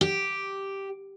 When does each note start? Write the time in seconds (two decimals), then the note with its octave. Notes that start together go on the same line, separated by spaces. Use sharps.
0.01 G4